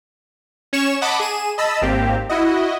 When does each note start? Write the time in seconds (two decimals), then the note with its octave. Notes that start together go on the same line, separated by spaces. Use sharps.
0.73 C#4 C#5 C#6 E7
1.02 D#5 F#5 A5 B5 D6
1.20 G#4 D#7 E7
1.58 D#5 A5 B5 E6
1.82 G#1 A#3 C4 G4
2.29 E4 F#4 D#5